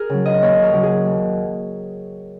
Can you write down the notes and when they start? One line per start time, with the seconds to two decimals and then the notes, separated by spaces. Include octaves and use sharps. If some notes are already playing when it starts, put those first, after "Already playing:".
Already playing: G#4 A#4
0.10 C#3 F#3
0.26 D#5
0.42 D#2 C#5
0.63 A#4
0.72 C#3 F#3
0.83 G#4
1.05 D#2